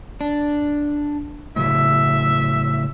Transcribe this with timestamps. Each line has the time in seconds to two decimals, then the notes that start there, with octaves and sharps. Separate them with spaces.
0.21 D4
1.56 A2 C#3 F#3 E5